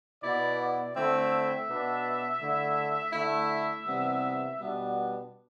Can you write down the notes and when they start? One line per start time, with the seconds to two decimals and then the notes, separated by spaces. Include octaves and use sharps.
0.22 B2 B3 E4 D5
0.59 D5
0.95 D3 A3 C4 E4 E5
1.68 B2 B3 D4
2.40 D3 A3 E4
3.13 D3 A3 E4 E5
3.86 C3 E3 G3 B3
4.59 B2 G3 B3 D4